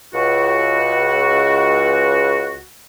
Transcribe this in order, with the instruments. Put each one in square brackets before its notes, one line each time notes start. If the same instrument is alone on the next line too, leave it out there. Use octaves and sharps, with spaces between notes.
[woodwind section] C#2 F#4